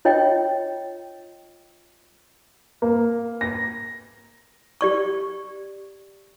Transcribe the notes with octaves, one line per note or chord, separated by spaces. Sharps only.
F4 C#5 D#5 G5
A#3
A#6
G4 D5 C#6